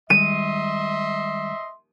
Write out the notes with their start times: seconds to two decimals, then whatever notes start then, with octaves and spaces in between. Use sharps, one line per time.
0.10 D#3 G3 G#3 D#5 E5 C6 D#7